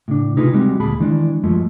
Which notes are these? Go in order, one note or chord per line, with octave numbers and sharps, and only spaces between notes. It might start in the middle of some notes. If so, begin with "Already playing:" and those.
A2 C#3 D4
C3 D#4 F4 G#4 B4
G3 G#3 C4 F#4
D2 A#2 G#4 A5 B5
D#3 E3 G#3 D4
F#2 F3 G#3 A3